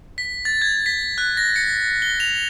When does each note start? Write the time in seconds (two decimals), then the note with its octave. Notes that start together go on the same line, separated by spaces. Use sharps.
0.18 B6
0.45 A6
0.62 G#6
0.86 B6
1.18 F#6
1.37 A#6
1.56 C#7
2.02 G7
2.20 F7